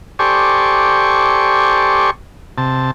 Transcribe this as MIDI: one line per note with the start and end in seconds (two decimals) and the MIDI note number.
0.19 2.10 67
0.19 2.10 69
0.19 2.10 72
0.19 2.10 74
0.19 2.10 80
0.19 2.10 85
2.58 2.91 48
2.58 2.91 81